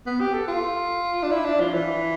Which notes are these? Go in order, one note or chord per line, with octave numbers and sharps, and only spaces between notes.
B3
G4
A4
F4
D4
E4
D4
F3
E3